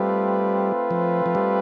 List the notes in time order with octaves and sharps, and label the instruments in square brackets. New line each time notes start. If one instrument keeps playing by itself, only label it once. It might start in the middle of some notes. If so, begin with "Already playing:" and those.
Already playing: [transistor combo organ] G3 [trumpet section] A3 C4 F4 B4
[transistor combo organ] F3
F3
G3